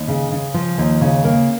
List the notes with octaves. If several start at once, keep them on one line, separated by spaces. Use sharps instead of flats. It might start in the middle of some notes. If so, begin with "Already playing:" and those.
Already playing: D#2
C#3
C#3
F3
D#2
C#3
A#3